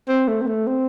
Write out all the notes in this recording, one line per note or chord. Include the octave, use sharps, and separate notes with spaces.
C4
A3
C4
A3
C4